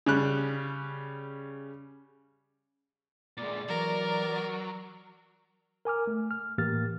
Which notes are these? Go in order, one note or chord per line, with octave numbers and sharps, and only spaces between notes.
C#3 G3 F#6
A#2 G#3 D5 D6
E3 F#3 A#4
A#4 G#5 D6 F6
A3
F6
A2 E3 A#3 G4 F6 A6